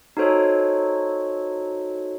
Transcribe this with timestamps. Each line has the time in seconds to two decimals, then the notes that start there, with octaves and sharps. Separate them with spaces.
0.17 D#4 F#4 A4 C5 C#5